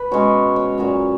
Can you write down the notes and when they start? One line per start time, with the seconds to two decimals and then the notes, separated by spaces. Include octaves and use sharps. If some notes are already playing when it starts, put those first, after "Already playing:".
Already playing: B4
0.11 B2 G#3 C#4 C#5
0.56 C#5
0.78 A#2 F#3 C#4